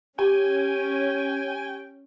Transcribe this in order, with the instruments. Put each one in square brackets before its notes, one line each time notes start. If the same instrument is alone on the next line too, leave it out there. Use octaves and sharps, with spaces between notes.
[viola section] C#4 [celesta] G4 [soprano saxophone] G5 [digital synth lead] G#5